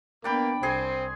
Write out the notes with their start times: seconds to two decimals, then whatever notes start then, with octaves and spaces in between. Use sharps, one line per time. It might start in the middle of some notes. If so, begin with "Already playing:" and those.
0.24 A#3 B3 D4 D5 G5 B5
0.63 C2 C4 G#4 G#5 C6